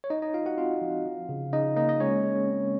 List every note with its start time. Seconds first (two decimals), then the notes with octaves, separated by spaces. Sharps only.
0.04 C#5
0.10 D#4 D#5
0.22 D#4 D#5
0.34 D#4 F4 F5
0.46 F#4 F#5
0.58 C4 F4 F5
0.81 F3
1.05 F3
1.29 C#3
1.53 C#3 D#4 D#5
1.76 A#3 D#4 D#5
1.89 D#5
2.00 G#3 C#4 C#5
2.24 G#3
2.48 C4